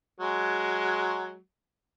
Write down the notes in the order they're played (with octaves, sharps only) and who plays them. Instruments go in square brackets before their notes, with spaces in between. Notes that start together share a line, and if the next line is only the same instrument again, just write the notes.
[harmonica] F#3 G#3